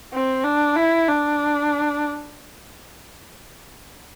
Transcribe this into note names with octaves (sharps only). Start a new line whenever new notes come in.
C4
D4
E4
D4